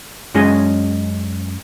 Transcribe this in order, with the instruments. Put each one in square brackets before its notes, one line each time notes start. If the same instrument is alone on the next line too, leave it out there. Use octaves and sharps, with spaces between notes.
[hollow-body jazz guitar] F#2 G#3 C#4 G#4 D#5